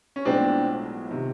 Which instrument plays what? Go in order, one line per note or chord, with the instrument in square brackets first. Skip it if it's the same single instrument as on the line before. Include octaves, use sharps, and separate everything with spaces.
[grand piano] C#4
[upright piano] B1 A2 F3 G#3 B3 [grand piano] C4 D4
[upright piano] C3 D#3